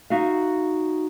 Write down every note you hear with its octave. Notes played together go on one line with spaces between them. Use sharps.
D#4 F#4 E5 F5